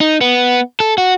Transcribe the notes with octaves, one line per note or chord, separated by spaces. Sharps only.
D#4
B3
A4
F#4